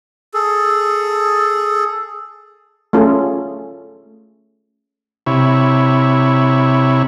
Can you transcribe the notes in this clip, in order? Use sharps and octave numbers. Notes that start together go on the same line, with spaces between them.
G#4 A4
A3 C#4 F4 G#4 A4
C3 E4 C#5